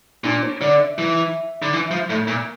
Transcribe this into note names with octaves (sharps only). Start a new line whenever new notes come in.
A#2 D4
C#5
D3 D5
E5
E3
D3
E3
F3
A2
A#2